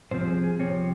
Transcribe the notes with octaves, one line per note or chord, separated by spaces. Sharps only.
C2 C3 F3 C4 C5
G#4
G#4
C2 C3 F3 C4 C#5